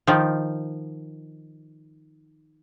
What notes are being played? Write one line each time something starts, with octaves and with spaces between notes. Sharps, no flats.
D#3 F3